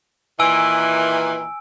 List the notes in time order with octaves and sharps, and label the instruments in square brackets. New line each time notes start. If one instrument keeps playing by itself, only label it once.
[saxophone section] A#2 D#3 E3 [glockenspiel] G#5 E6 D7